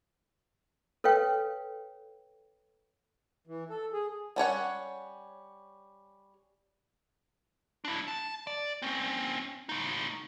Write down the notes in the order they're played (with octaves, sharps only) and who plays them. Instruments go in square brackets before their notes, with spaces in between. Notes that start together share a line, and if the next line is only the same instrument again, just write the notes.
[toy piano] A4 B4 C#5 F5 G5
[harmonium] E3
A4
G#4
[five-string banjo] G3 C#4 C#5 F#5
[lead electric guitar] D4 E4
A5
D5
C4 C#4
A2 D#4